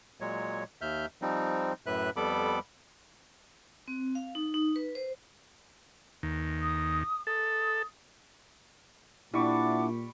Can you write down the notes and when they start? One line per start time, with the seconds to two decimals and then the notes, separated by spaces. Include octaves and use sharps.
0.21 A#2 F#3 G#3 C#5
0.81 D#2 E5 F6 G6
1.22 F3 G3 C4 D#4
1.86 F#2 A2 B4 E5 F#6
2.16 F2 G3 B3 A4 B5 D6
3.88 C4
4.15 F5
4.35 D#4
4.54 D#4
4.76 B4
4.95 C5
6.23 D#2
6.61 D#6
7.27 A4 D#6
9.34 A#2 G3 D4 E4 F#5 C#6 D6